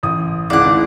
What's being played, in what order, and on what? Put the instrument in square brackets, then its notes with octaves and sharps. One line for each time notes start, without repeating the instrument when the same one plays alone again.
[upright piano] A1 D#6
[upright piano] G#1 C#2 [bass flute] E4 [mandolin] D5 F#5